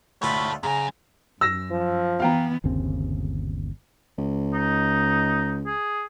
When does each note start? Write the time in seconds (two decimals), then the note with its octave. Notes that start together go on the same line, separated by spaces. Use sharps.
0.22 D2 A3 F4 A4 C#5 B5
0.63 F#2 C#3 G#5 A#5
1.41 F#2 E6 A#6 E7
1.71 F3
2.20 E3 B3 F5 G5 A#5
2.64 G1 D#2 C#3 C4
4.18 C#2
4.54 D#4
5.66 G#4